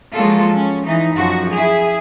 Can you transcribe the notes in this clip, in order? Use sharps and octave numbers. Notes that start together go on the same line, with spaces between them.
F3 F#3 G#3 A#3 F4 A4
C#4
E3 D#4
F#2 F3 F#4
E4 G#4